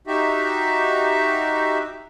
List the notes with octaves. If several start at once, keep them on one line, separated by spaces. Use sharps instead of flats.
D#4 F#4 G4 E5